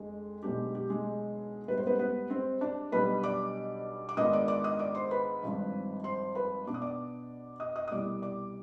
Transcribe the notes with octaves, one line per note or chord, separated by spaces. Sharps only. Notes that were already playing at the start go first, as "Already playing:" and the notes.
Already playing: F2 G#3 D4 G#4
B1 B2 G#3 B3 D4 G4
G4
G#3 G#4
G#2 G3 B3 B4
C5
B3 B4
B3 B4
C4 C5
D4 D5
B1 B2 G3 B3 D4 B4 B5
D5 D6
D6
G#2 D#3 B3 D4 F4 D#5 D#6
D5 D6
D5 D6
D#5 D#6
D5 D6
C5 C6
B4 B5
G#1 G2 F3 C4
C5 C6
B4 B5
B2 B3 D4 D6
D#6
D5 D6
D#5 D#6
D#5 D#6
D#6
C2 B2 G3 D5 D6
D5 D6